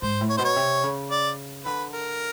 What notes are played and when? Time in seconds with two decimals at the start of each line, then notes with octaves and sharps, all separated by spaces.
0.02 G#2 C5
0.21 A2
0.29 C#5
0.37 B2 C5
0.45 C#5
0.56 C3
0.84 C#3
1.11 D5
1.65 D3 B4
1.93 A#4